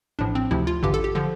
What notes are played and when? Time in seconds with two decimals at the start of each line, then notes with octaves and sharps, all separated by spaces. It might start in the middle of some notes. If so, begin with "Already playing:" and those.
0.19 A1 A2 F3 D4
0.35 C4
0.51 D2 C3 F3 E4
0.67 F4
0.83 A1 G2 D3 G4
0.94 A4
1.04 G4
1.15 D3 F3